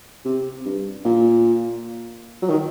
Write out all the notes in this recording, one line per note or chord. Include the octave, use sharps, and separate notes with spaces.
C3
G2
A#2
F#3
D#3